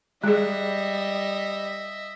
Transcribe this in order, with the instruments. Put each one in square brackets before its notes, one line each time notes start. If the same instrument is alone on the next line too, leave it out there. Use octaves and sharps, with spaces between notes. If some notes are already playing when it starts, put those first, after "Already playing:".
[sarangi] G3 [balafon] G#3 G#4 [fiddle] D#5 E5